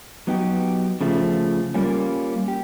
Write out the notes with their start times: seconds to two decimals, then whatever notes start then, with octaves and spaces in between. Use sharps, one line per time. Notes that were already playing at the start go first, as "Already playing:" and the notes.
0.27 F#3 B3 D#4 G4
1.01 C#3 F3 A3
1.74 G3 A#3 C#4 F4
2.48 G4